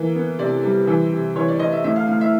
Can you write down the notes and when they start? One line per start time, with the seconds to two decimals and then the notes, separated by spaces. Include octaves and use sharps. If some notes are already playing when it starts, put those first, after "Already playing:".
Already playing: E3 A#3
0.15 B3
0.39 C3 D5
0.63 G3
0.87 E3
1.12 C3
1.36 E3 C#5
1.48 D5
1.59 E3 D#5
1.72 E5
1.84 A2 E5
1.96 F5
2.08 A2 F5
2.21 E5